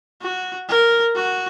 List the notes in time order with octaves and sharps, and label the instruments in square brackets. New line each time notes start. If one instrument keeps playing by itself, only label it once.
[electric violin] F#4
A#4
F#4